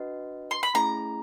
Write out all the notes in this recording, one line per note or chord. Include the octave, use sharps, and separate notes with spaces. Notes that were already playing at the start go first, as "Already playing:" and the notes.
Already playing: D4 F#4 B4 D#5 F#5
C6
B5
A3 C#4 E4 G#4 A#5